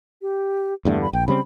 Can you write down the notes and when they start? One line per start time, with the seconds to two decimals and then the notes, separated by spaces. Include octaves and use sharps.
0.22 G4
0.85 E2 G2 D3 A3
1.02 B5
1.13 A#1 G5
1.28 C#3 G3 C4 B5